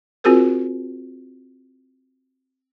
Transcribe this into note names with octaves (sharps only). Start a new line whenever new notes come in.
C4 F4 F#4 G#4 A#4 C5